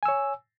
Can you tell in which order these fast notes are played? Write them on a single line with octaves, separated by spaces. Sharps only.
G#5 E6 C#5